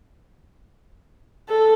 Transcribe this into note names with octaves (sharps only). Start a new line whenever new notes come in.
A4